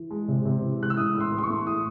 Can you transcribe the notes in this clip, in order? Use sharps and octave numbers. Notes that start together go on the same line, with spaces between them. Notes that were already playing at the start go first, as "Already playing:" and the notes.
Already playing: E3
G#3
C3
C3
E3
G#3 F#6
E6
A2 D#6
A2
C6
E3
C6
C#6
A3
A2 D#6